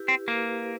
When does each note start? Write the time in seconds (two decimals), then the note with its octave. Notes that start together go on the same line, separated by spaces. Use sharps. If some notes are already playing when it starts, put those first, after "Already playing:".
Already playing: E4 G4 B4
0.08 C4
0.28 A#3 E4 G4 B4